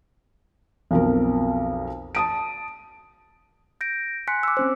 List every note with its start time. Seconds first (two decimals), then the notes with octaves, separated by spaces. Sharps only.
0.91 B1 F2 A#4
2.15 A5 D#6 D7
3.81 G6 A#6 D7
4.28 G#5 C6 F#6 B6 C#7
4.43 D6 E6
4.57 C4 C#4 C5